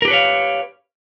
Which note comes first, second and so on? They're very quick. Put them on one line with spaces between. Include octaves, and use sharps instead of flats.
A#4 G4 B4 C#5 F5